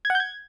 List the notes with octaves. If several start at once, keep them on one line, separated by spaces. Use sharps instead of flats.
G#6
F#5
G6
G#6